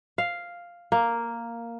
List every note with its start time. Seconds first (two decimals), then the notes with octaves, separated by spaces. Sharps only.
0.18 F5
0.92 A#3